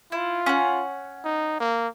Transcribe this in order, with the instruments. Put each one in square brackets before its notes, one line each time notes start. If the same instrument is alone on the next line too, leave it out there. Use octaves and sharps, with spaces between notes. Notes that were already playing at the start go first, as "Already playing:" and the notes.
[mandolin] E4 [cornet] F4
[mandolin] C#4 F#5
[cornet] D#4
A#3